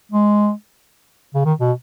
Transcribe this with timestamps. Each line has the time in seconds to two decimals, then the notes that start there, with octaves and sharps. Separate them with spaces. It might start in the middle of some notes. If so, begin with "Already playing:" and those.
0.12 G#3
1.34 C#3
1.45 D#3
1.60 B2